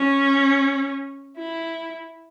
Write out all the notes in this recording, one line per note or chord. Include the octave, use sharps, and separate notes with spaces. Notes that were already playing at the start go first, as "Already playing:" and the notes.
Already playing: C#4
E4